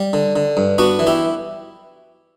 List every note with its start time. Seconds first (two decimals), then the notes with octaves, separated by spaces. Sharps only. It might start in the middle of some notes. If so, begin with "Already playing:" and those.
Already playing: G3
0.13 D3
0.36 D3
0.57 G2
0.78 B3 D4 F#4
0.99 E3
1.07 E4 G4